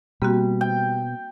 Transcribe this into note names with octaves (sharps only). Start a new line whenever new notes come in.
B2 G3 A#3 C4 F#4
G5